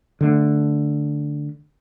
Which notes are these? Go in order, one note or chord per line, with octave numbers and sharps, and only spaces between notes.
D3 A3